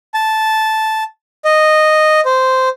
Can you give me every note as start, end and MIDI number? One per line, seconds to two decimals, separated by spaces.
0.14 1.04 81
1.45 2.20 75
2.25 2.69 72